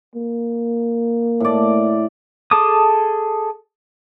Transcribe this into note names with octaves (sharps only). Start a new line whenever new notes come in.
A#3
A2 D5
G#4 A4 A5 D6 D#6